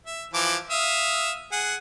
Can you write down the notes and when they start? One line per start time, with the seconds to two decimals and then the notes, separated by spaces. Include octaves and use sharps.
0.06 E5
0.34 E3 F3 D6
0.70 E5 F5 D#6
1.52 G#4 F#5